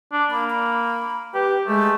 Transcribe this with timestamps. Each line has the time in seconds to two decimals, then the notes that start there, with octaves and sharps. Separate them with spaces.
0.12 D4
0.31 A#3 B5
0.50 B5
1.34 G4 B4
1.67 G#3 A3